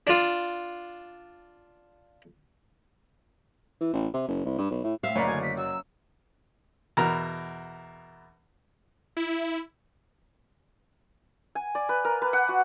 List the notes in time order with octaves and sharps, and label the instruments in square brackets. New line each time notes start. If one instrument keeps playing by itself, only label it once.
[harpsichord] D4 F4
[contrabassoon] E3
A1
C3
F#1
C2
G2
B1
A2
[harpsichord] A2 C4 [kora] E5 F5
[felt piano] F#1 D5 A#5 [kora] C#4 [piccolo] B5
[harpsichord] D2 [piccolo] G#5
[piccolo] B6
[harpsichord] F#3 [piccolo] E6
[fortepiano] E2 B2 A#4 A#5
[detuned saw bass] E4
[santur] G#5
D5
B4
A#4
B4
F#5
F#4